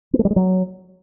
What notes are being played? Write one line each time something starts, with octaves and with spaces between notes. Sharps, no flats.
B3
A3
G3
G#3
F#3